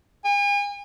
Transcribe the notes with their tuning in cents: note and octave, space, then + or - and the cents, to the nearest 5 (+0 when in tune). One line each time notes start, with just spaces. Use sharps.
G#5 -40